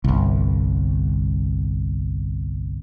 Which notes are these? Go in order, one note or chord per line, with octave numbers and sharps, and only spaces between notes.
G1 C2